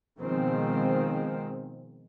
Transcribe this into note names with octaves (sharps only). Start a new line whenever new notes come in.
B2 D#3 F3 G#3 C4